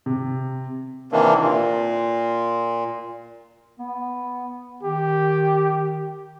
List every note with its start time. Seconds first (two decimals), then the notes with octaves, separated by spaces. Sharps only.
0.06 C3
1.12 C3 D#3 E3 A#3 D4
1.41 A#2
3.80 B3
4.83 D#3 G4